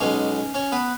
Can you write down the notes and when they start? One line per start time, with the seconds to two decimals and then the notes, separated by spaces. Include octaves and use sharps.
0.01 B1 B2 G#3 C#4 C#5
0.54 C#4 C#5
0.72 B3 B4